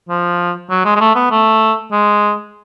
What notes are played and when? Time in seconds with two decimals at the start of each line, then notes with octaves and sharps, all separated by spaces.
0.09 F3
0.70 F#3
0.85 G#3
0.96 G#3
1.01 A3
1.15 B3
1.31 A3
1.92 G#3